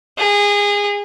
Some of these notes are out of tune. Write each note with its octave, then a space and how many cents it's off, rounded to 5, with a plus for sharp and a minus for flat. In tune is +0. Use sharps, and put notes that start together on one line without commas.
G#4 -25